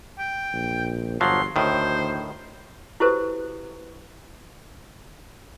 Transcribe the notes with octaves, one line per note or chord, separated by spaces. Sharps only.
G5
A#1
G1 F3 F#3 C6
D2 A2 D#3 C5
E4 F#4 G4 A4 B4 C5